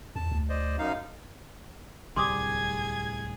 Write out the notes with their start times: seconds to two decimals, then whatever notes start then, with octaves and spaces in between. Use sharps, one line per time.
0.16 E2 A5
0.31 D2
0.49 C5 D5 D#5
0.78 F#2 D#4 F5
2.16 D1 C2 G3 G#4 C6 D6 D#6 G#6